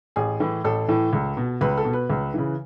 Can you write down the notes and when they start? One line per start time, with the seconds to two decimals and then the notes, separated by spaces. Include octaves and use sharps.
0.16 A1 G#4
0.40 A2 E3
0.64 A1 A4
0.88 A2 E3
1.13 C#2
1.37 B2
1.61 C#2 B4
1.78 A4
1.85 B2
1.93 B4
2.10 C#2
2.34 C#3 E3